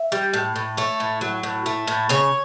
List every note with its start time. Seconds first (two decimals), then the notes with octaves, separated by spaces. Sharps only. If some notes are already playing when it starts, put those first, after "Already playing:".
Already playing: E5
0.12 G3
0.34 A2
0.56 A2
0.77 A3 C#5
1.00 A2
1.21 F#3
1.43 A2
1.66 A3
1.87 A2
2.09 C#3 C#5